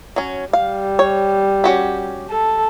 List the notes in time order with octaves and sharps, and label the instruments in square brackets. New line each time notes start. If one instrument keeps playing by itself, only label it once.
[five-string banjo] F#3 C#4
[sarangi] G3 [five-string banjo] F5
[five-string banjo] C#5
C#4 F#4 G4
[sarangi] A4